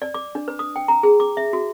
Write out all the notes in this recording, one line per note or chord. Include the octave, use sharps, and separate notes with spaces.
D5
D6
D4
B4
D#6
G5
A#5
G#4
D6
E5
F#4